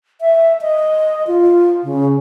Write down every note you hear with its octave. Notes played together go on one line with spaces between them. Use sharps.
E5
D#5
F4
C#3